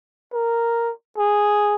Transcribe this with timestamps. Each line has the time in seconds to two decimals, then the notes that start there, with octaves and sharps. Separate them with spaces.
0.33 A#4
1.18 G#4